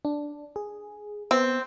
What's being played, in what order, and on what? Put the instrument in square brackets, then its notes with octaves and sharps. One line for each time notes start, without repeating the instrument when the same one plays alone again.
[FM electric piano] D4
G#4
[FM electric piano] B3 [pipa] C4